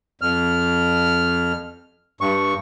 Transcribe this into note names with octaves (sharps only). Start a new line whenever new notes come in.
F2 F6
G2 C#6